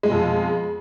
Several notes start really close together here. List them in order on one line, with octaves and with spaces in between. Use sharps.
G#3 B2 F2